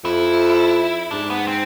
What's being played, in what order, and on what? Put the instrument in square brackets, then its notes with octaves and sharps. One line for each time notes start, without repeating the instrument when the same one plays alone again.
[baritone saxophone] F2 [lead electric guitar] E4
[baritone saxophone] G#2 [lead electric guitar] D4
[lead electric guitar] B3
C4